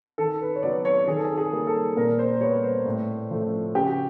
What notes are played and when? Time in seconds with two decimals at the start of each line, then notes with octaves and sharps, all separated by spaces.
0.18 D#3 A4
0.41 B4
0.56 C#5
0.63 F#3 B3 D5
0.85 C#5
1.07 D#3 G#4
1.16 A4
1.25 G#4
1.38 G#4
1.52 G3 A#3
1.67 A4
1.97 A#2 A#4
2.19 C5
2.40 G3 B3 C#5
2.63 C5
2.85 A2
3.31 F3 A3
3.75 C#3 G4
3.86 F#4